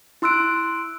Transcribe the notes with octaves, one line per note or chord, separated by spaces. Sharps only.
E4 C6 E6 F#6 D7